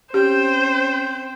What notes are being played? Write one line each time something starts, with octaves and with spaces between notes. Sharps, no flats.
C4 C#4 G4 C5 G5